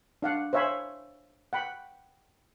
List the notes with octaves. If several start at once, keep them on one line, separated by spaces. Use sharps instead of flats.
D4 F5 F#5
C5 C#5 E5 F5 G#5 B5
F#5 G5 B5